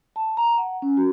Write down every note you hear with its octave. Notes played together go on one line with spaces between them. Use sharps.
A5
A#5
F#5
C#4
F#4